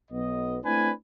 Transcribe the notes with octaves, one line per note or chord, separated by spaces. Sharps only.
B1 B3 D#5
A3 C4 D4 E4 B4 G#5